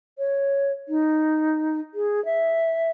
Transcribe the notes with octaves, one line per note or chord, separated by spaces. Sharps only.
C#5
D#4
G#4
E5